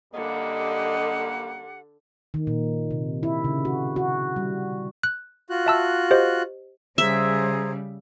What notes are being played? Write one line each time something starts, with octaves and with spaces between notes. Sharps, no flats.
F#2 D3 G3 A#3 G4 D#5 F#5
D#3
A#2
C3
E4
C#3
F#4
F#4
G3
F#6
F4 F#4 F#6
E5 A5 E6
G4 C5 D#5
C#3 G3 G#4 C5 E5 A#5